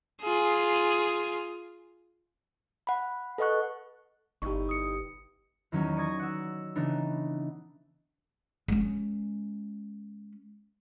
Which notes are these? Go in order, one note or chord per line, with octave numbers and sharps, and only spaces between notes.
F4 G#4
F#5 B5
A4 B4 D#5 F#5 C#6 F#6
G1 D#4 E4 G4 C#6
D#6 C#7
E2 D#3 F#3 C#4 D#4
C#5 D5 C#6 D#6 G#6 A#6
F#5 E6
C#3 E3 B3 D4 D#4
G#3 C#4